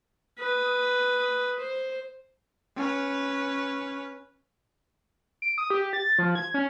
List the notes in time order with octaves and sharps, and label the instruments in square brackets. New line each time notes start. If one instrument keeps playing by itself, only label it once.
[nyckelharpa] B4 D#6
C5
[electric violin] C#4 B4
[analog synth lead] D7
D#6
G4
A6
F3
G#6
C#4